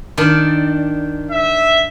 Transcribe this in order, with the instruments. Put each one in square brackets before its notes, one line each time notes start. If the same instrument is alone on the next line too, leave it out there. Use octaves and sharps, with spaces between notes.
[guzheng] D#3 D4 D5
[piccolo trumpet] E5